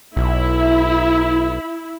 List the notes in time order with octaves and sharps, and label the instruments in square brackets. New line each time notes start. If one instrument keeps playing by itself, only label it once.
[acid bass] B1 [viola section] E4